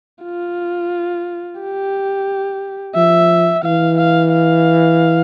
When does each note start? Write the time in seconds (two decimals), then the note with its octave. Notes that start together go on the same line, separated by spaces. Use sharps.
0.24 F4
1.60 G4
2.95 F3 E5
3.64 E3 F5
3.97 F5
4.32 F5